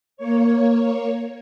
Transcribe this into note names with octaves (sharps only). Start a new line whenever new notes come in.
A#3 C#5